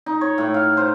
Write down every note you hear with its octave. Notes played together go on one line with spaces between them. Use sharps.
D#4
C#5
A2
F5
C5